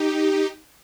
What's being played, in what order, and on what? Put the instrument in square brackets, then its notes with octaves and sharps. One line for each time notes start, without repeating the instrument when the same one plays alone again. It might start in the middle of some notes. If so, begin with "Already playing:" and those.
Already playing: [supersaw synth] D#4 G4